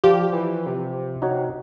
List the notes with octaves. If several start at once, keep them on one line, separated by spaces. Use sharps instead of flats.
F3 F4 G4 D5
E3
C3
D#4 F#4 C#5